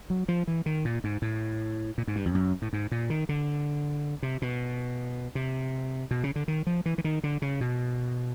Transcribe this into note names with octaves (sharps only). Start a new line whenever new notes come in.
F#3
F3
E3
D#3
A#2
G#2
A2
A#2
G#2
G2
F2
F#2
A2
G#2
A#2
D#3
D3
C3
B2
C3
B2
C#3
D3
D#3
F3
E3
E3
D#3
D3
C#3
B2